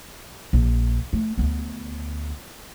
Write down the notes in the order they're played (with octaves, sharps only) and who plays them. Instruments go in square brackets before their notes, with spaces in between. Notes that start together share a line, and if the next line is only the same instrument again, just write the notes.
[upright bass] A#1
A3
D2 B3